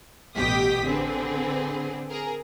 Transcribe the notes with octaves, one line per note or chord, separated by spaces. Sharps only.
A1 B2 G4 G5 D#6 B6
D3 C4 G#4 B4
G#4 A#4